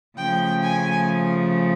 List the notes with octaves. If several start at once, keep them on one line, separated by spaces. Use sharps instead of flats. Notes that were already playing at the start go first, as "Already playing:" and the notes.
C#3 F3 A3 G5
G#5